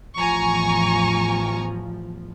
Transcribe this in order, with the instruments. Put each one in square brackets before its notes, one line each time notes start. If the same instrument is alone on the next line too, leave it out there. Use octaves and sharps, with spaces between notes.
[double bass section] A1 E2 F3 [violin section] G#5 A#5 C#6